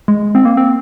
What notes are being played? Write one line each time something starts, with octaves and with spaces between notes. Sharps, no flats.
G#3
C4
A#3
C4